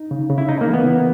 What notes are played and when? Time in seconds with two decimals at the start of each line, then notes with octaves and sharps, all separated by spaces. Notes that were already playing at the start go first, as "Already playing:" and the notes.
Already playing: D#4
0.11 C#3
0.30 C#3
0.38 E4
0.49 C#4 D#4
0.61 A#3
0.68 E3
0.73 B3
0.86 E4